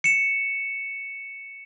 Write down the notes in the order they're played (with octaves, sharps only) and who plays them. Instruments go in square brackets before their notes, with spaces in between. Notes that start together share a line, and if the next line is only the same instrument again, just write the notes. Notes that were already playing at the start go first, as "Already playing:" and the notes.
[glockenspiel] C#7 E7